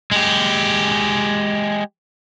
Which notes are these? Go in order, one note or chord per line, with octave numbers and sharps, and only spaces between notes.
G#3 G4